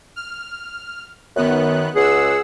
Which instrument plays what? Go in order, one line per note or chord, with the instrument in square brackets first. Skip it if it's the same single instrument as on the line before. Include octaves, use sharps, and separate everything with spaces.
[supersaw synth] F6
[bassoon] F#2 [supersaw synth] D#3 B3 F#6
[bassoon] C#2 [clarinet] G#4 [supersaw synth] F#5 E6